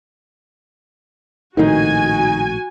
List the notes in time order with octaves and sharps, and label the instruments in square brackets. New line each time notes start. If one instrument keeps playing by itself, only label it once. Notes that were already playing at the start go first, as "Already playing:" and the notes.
[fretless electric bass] A#1 A2 C3 [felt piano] D#3 D#4 [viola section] F#4 G#5